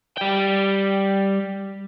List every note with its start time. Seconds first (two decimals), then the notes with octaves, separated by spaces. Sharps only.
0.17 G3 G5